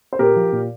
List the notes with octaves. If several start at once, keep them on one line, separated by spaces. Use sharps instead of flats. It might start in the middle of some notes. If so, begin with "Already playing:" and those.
C5
A#2 G4 A#4
F3
A#2